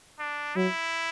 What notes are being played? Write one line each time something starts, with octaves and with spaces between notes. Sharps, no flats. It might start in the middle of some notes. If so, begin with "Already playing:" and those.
D4
F#3 E4